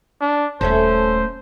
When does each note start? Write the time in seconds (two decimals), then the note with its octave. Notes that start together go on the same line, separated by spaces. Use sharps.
0.21 D4
0.61 D#1 A#2 A3 C#4 A4 C5